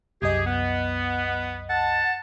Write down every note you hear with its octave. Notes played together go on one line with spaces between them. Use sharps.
C2 F#2 G4 G#4 D#5
B3
F#5 A5